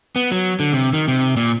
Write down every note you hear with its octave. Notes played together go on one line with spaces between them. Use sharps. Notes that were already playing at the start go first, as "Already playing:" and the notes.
B3
F#3
D3
C3
D#3
C3
A#2